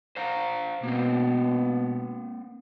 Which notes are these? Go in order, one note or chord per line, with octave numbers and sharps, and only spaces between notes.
C5 F5 A#5
B2 A#3 C4